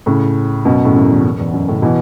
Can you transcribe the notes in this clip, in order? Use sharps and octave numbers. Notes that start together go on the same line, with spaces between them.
A2 C#3
F#2 B2
A2 C#3
F#2
E2
F#2
E2
F#2
A2 C#3
B2 E3